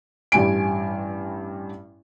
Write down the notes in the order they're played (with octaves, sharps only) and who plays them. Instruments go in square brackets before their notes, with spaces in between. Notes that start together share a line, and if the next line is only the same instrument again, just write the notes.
[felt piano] A1 G2 G3 G#5 D7